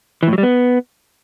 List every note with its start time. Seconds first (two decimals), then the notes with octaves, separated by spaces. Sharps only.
0.23 E3
0.28 A2
0.33 F#3
0.38 G3
0.43 B3